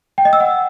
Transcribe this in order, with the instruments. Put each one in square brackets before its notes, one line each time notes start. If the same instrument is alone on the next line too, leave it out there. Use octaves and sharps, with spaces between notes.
[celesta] G5
D#5
E6
F#5